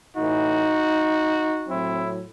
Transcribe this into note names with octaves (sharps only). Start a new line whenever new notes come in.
A2 E3 D#4 F#4
A2 F#3 C4 E4